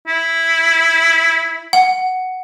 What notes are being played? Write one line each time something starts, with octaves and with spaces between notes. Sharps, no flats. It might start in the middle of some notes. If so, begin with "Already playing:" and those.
E4
F#5